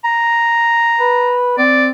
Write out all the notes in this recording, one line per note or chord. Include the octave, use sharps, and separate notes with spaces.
A#5
B4
C4 D5